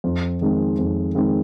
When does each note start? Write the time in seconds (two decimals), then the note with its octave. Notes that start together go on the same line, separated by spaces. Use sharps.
0.04 F2
0.41 D#3 G#3 C4
0.79 F2
1.15 D#3 G#3 C4